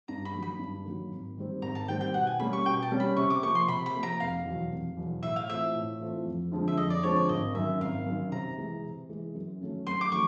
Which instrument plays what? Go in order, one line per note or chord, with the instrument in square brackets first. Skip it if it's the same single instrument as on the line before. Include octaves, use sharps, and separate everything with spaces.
[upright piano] G2 [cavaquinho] A#5
[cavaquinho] B5
[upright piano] D#3 F#3 A#3
[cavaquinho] B5
[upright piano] G2
D#3 F#3 A#3
G#1
G#2 D#3 G3 C4
[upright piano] G#1 [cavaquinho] A#5
[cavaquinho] A5
[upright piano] G#2 D#3 G3 C4 [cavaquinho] G5
[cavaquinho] G5
[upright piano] B2 [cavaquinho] F#5
[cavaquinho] G#5
[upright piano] G3 A#3 C#4 [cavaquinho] B5
[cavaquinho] C#6
[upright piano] B2 [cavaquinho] G5
[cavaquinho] A5
[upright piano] G3 A#3 C#4
[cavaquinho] B5
[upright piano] C3 [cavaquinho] C#6
[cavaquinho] D6
[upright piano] F3 A#3 [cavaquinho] C#6
[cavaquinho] C6
[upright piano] C3 [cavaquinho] B5
[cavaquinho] B5
[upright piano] F3 A#3
[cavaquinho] A#5
[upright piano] F1 [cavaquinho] F5
[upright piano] E2 B2 F#3
F1
E2 B2 F#3
[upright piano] A2 [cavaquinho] E5
[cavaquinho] F5
[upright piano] E3 A3 C4 F4 [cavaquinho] E5
[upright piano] A2
E3 A3 C4 F4
F2
D3 F3 G#3 C4
[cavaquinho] E5
[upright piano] F2 [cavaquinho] D#5
[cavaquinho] D5
[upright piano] D3 F3 G#3 C4 [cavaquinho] C#5
[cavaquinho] D5
[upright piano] G#1 [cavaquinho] D#5
[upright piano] F#2 D#3 [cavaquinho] E5
[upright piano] G#1 [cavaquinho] F5
[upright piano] F#2 D#3
[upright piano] C3 [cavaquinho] A#5
[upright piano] E3 G#3
C3
E3 G#3
F#2
D#3 F#3 A3 C#4
[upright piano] F#2 [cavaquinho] C6
[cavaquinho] D6
[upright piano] D#3 F#3 A3 [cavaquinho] C#6